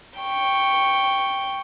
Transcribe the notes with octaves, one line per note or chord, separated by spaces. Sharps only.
G5 C#6